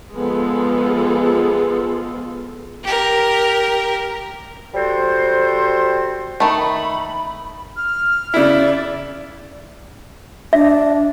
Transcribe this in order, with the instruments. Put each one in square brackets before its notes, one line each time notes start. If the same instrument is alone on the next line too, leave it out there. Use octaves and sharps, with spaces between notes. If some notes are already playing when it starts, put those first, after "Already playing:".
[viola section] F3 G#3 B3 F4 G#4 A4
[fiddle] G4 A#4
[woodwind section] G3 F#4 A4 C5
[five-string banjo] D#3 A3 [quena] B5
[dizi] F6
[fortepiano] C#3 E4 [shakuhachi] D5
[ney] D4 [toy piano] E5